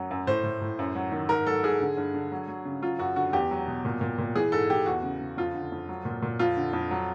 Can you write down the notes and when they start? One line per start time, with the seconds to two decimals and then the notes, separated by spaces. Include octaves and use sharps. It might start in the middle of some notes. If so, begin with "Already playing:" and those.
Already playing: F#2 F#3
0.11 F#2
0.27 A2 C5
0.44 A2
0.61 A2
0.79 F#2
0.95 F#3
1.12 D#3
1.29 G#2 A#4
1.46 F#3 A4
1.63 G#2 G#4
1.81 D3
1.97 G2
2.14 D3
2.32 F#3
2.48 F#3
2.65 C#3
2.82 F#3 F4
2.99 F#2 F#4
3.16 D3 F#4
3.33 E2 G4
3.51 F#3
3.67 B2
3.85 A#2
4.01 A#2
4.18 A#2
4.36 E3 G#4
4.52 G#2 A4
4.70 E3 G4
4.86 E2 F#4
5.03 C#3
5.21 C#3
5.37 F2 F4
5.55 D3
5.72 F2
5.89 F#3
6.05 A#2
6.22 A#2
6.39 F2 F4
6.57 D3
6.73 F2
6.91 F#3